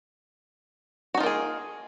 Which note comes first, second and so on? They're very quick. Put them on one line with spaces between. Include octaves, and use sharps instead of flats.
F#4 D#4 F4 A#3 G#4